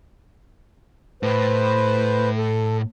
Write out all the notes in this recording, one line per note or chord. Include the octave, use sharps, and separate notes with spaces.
A2 B4 C5
A4